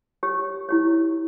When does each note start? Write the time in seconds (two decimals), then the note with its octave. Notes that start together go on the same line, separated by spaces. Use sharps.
0.23 G4 C#5
0.69 E4 G4 C#5